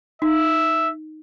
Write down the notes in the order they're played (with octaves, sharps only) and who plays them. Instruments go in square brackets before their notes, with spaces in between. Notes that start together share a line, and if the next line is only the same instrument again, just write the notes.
[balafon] D#4 [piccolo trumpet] E5